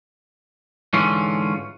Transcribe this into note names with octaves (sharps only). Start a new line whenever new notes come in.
G#2 D3 E3 C#4 F4